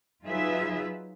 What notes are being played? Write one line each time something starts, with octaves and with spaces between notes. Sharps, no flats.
F#3 D#4 F4 G#4 B4 E5